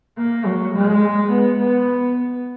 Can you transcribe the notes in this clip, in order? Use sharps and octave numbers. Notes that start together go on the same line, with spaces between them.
A#3
F#3
G#3
B3
B3